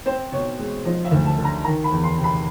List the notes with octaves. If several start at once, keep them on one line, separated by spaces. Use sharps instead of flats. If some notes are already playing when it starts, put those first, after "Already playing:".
C4 C5
B2 C#5
G#3
F3 D#5
E5
D2
A5
D3
A#5
D#3 A#5
B5
E2
C6
C3
B5